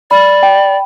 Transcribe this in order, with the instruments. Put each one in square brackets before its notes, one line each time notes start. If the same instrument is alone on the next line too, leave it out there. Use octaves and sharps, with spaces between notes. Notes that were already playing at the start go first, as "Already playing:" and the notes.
[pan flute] D5 [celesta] B5
[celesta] G5